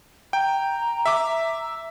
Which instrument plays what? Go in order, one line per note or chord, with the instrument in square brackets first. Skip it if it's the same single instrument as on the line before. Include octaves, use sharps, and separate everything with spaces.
[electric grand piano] G5 [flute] A#5
[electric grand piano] E5 D6